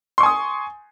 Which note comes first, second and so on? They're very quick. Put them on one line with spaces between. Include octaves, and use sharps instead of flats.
C6 C#6 G#5 D#6